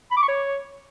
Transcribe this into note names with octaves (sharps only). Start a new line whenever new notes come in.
B5
D6
C#6
C#5